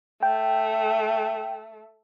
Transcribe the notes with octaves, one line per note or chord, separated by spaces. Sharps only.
A3 G5